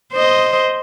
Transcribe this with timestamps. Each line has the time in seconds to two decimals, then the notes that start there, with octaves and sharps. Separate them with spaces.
0.13 C5 D#5